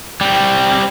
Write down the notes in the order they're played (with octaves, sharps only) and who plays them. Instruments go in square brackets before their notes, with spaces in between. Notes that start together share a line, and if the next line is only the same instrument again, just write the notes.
[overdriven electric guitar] G3 C4